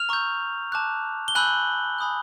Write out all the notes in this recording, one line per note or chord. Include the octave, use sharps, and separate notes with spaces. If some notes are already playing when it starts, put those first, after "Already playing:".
Already playing: F6 F7
A#5 C#6 E6 G6
A5 D6 F#6
G7
G#5 B5 E6 F#6 G6 F#7
G#5 B5 D#6 F#6